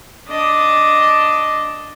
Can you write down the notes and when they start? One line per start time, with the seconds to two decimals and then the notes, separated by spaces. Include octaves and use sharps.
0.28 D4 D#5